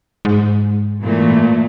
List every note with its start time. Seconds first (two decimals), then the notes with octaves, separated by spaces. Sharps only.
0.25 G#2
1.02 A#2 E3 A3